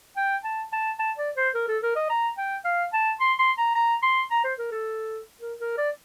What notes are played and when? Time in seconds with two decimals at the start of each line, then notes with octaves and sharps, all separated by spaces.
0.17 G5
0.44 A5
0.73 A5
0.99 A5
1.18 D5
1.37 C5
1.55 A#4
1.69 A4
1.83 A#4
1.96 D#5
2.10 A#5
2.38 G5
2.65 F5
2.94 A5
3.21 C6
3.39 C6
3.58 A#5
3.76 A#5
4.03 C6
4.31 A#5
4.44 C5
4.59 A#4
4.72 A4
5.41 A#4
5.60 A#4
5.78 D5